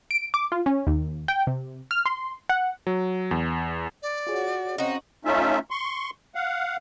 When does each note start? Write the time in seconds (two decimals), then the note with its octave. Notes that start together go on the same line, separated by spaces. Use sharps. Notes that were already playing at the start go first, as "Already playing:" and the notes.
0.11 D7
0.34 D6
0.52 F4
0.66 C#4
0.87 D#2
1.28 G5
1.47 C3
1.91 F6
2.06 C6
2.49 F#5
2.87 F#3
3.31 E2
4.03 D5
4.27 F4 F#4 G#4 C#5
4.78 C4 C#4 D#4 F#4
5.25 A3 C#4 D#4 F4 E5
5.70 C6 C#6
6.35 F5 F#5